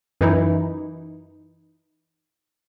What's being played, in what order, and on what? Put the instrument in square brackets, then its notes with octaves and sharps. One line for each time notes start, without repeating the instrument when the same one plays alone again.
[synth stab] F#2 E3 D#4 E4